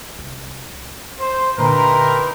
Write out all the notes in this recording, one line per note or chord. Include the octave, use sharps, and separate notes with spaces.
C2
C5
A#2 D3 D#4 E4 G4 A#4 B4 C6